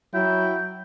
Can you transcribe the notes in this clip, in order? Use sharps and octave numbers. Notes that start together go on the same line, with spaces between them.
F#3 E4 G5